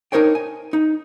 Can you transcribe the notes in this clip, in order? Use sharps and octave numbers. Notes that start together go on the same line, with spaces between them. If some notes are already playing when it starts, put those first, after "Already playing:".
D4 D#4 A#4 C5 C#5 G5
G#5
D#4